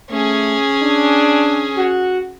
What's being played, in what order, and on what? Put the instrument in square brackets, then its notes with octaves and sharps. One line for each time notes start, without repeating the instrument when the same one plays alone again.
[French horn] A3 [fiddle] C#4 G#4
[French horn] D4
F#4